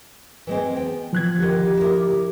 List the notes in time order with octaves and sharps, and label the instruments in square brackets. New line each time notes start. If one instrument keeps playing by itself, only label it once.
[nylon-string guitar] E3 G#3 C4
B3 G5
[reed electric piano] F3 F#6 G#6
[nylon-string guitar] D3 D#3 [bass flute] G4
[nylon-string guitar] E4 A#4